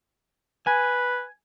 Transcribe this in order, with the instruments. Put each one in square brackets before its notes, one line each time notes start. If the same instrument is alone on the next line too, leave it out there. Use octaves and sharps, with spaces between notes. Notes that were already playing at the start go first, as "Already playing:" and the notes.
[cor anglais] B4 [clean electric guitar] G#5